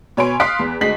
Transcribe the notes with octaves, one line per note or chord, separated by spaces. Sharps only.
B2 C#5 G#5 B5 C6 D7
F5 C6 D#6 F#6 B6 D7
E2
D2 G#3 D#5 B6 C7 F#7